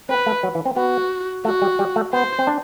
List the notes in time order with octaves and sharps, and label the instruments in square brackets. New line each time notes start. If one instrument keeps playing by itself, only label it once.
[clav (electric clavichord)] C4 [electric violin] B4
[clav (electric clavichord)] A3
F#3
E3
C4
[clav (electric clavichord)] B3 [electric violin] F#4
[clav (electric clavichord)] A3 [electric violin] F#4
[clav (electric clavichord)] G3
G3
A3
[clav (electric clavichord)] B3 [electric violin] C5
[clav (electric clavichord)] C4
D4